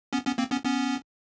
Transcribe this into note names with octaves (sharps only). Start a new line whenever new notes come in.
B3 C#4
B3 C#4
A#3 C4
B3 C#4
B3 C#4